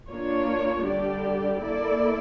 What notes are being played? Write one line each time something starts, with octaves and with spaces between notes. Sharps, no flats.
A#3 D4 F4 C#5
D3 G3 D4 G4 D5
A#3 E4 A4 D5